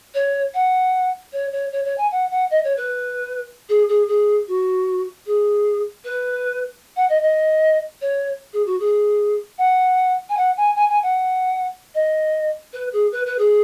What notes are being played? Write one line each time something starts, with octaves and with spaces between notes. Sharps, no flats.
C#5
F#5
C#5
C#5
C#5
C#5
G#5
F#5
F#5
D#5
C#5
B4
G#4
G#4
G#4
F#4
G#4
B4
F#5
D#5
D#5
C#5
G#4
F#4
G#4
F#5
G#5
F#5
G#5
G#5
G#5
F#5
D#5
B4
G#4
B4
B4
G#4